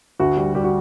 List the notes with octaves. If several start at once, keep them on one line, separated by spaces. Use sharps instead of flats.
D2 F#4
G3
G3 G4
F#4